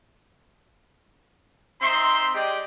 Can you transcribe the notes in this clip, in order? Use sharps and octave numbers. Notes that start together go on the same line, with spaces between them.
C4 D#4 E5 C6
G#3 G4 D5 D#5 G5